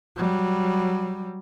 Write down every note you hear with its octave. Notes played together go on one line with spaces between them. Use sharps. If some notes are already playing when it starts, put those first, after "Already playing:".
F#3 G3